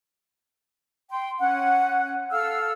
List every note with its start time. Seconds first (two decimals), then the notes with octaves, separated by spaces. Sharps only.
1.09 G5 C6
1.40 C#4 F#5
2.31 A4 F5 E6 F6